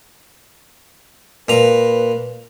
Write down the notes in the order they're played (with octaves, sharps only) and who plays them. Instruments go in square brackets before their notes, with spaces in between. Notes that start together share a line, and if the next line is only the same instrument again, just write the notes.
[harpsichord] A#2 A#5 [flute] B4